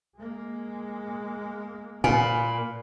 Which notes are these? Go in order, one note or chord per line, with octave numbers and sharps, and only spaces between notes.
G#3 A#3
A#2 F4 B4 G#5